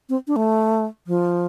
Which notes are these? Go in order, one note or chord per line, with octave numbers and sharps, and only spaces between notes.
C4
D4
A3
F3